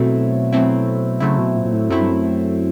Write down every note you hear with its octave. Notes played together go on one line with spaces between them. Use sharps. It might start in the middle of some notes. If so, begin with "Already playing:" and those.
Already playing: B2 F#3 A3 C4 E4
F#3 A3 C4 E4
C#3 F#3 A3 C4 E4
B2
A#2
A#2
A2
F#2 F#3 A3 C4 E4
G2
F#2